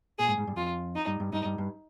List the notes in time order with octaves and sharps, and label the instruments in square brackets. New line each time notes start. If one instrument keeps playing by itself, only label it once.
[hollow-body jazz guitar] A#2 [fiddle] G#4
[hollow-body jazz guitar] G#2
G#2
G2
[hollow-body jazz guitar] F2 [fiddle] F4
[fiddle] D#4
[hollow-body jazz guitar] G2
G2
[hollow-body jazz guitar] G2 [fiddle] D#4
[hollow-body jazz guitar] G2
G2